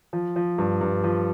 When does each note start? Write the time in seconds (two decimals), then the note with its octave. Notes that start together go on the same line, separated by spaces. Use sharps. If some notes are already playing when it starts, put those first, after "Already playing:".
0.13 F3
0.36 F3
0.58 G2
0.81 G2
1.04 F3